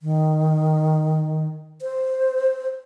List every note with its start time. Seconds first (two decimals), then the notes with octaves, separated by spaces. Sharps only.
0.01 D#3
1.82 C5